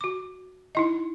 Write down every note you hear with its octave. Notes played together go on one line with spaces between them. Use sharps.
F#4 D6
D#4 E4 D#5